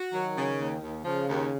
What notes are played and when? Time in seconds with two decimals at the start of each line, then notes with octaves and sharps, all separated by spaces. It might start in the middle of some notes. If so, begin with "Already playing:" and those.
Already playing: F#4
0.12 D#3 F#3
0.36 C#3
0.58 D#2
0.82 D#2
1.04 C#3 F3
1.28 D#2